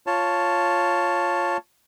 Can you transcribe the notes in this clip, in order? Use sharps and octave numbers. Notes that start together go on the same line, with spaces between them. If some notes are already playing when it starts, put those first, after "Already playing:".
F4 C#5 A5